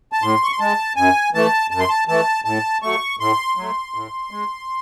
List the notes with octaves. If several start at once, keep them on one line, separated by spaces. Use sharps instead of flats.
A5
A2 C6
C#6
C6
G#3 A5
F#2 G#5
E3 A3 A5
F#2 A5
C6
A5
E3 A3 A5
A2 A5
F#3 A3 C#6
A2 C6
F#3 A3
A2
G#3